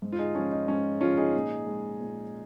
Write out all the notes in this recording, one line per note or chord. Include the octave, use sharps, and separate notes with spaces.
G#2
F4
D#4 G#4
F3 G#3 C#4 F4
D#4
G#2 C#4
F3 G#3 C#4 F4
D#4 G#4
A#2
G#3
A#2